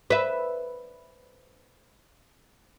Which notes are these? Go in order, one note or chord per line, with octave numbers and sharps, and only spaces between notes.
B4 E5